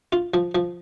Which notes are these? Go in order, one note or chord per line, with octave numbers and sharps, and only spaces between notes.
F4
F3
F3